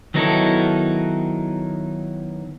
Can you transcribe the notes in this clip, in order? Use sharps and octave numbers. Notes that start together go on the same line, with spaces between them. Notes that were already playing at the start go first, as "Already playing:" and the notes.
D#3 F#3 B3 D#4 E4 A4